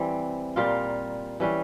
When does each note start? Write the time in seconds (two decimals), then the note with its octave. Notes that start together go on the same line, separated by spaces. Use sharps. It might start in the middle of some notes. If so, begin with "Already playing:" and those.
Already playing: E3 G3 C4
0.56 A#2 G3 A#3 F4
1.40 E3 G3 C#4